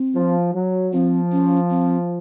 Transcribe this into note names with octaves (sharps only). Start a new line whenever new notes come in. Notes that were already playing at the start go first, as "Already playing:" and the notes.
Already playing: C4
F3
F#3
F3 C4
C#4
C4